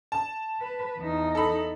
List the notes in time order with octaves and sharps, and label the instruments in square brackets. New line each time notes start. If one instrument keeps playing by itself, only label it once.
[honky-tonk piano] A5
[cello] B4
E2 D#4
[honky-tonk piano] A4 B5